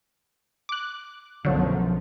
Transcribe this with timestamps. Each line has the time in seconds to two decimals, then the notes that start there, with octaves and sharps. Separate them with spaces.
0.69 D6 F#6
1.45 B1 F#2 D3 F3 F#3 A3